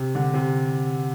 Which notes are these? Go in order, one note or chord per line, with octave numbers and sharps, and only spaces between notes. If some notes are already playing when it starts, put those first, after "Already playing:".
Already playing: C3
D3
C3